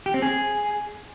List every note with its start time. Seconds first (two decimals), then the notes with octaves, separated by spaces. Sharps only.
0.06 G4
0.14 C4
0.22 G#4